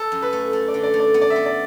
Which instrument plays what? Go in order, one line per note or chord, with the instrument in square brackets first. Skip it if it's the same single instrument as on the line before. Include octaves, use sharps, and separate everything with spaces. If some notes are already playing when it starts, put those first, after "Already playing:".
Already playing: [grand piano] A4
[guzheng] F#2
[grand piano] B4
[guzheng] A3
A3
[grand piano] D5
[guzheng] D3
[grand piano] D5
[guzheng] A3
[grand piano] D5
[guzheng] B3
[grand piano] D5
E5
[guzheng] B3
[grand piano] D5